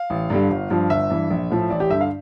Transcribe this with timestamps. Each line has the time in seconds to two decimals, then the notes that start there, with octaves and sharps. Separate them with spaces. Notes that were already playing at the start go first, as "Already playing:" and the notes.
Already playing: F5
0.10 A1
0.30 G2 D3 G3
0.50 G1
0.70 G2 F3
0.90 G1 E5
1.10 G2 E3
1.30 A#1
1.50 A2 F3
1.70 A1 D5
1.80 G4
1.90 G2 D3 E5
2.01 F5